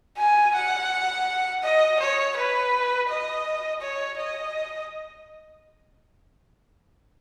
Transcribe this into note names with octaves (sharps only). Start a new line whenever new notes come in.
G#5
F#5
D#5
C#5
B4
D#5
C#5
D#5